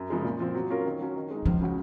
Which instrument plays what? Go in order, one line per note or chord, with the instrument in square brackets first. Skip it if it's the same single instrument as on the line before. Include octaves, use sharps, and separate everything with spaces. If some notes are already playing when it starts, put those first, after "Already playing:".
Already playing: [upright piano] F#2
C#3 F3 G#3
A#2
F3 C4
F#3
C#4 F4 A#4
D#3
F#3 C#4
D#3
G#3 D#4
[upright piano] C#2 [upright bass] F3
[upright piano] C#3 G#3 C#4 F#4